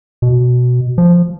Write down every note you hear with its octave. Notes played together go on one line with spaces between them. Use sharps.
B2
F3